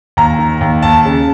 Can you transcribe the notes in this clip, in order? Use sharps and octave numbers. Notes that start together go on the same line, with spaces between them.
D#2 A#5
D#3
D#2
D#2 A5
C#3